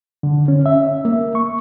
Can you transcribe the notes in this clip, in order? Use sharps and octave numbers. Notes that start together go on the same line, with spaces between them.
D3
C#4
E5
A#3
C#6